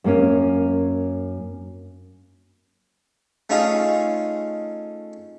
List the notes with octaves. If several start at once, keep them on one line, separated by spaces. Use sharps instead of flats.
F#2 A#3 C#4
A3 C#4 D#4 F4 G#4